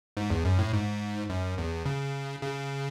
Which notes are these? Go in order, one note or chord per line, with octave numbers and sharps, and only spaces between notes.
G#2
E2
F#2
A2
G#2
F#2
E2
C#3
C#3